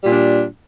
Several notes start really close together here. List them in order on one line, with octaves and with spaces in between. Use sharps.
G3 A#2 D4